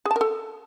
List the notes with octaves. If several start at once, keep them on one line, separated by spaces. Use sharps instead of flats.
G#4
A5
A#4
A4